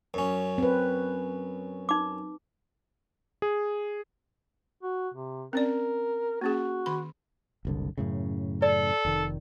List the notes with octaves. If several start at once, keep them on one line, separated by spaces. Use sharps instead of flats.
F#2 C#4
C4 B4
D#4 D6
G#4
F#4
C3
C4 C#4 A#4 D5
A#3 C#4 F#4 G#4
D#3 B5
F#1 C2 D3
F#2 A2 C#3
A4 D5
F1 D#3